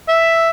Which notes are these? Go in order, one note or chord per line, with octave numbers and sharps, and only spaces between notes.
E5